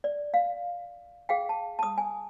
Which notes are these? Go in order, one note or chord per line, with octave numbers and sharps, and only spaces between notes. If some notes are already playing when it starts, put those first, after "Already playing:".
D5
F5
G#4 F5 G5
A5
A5 D#6
G#5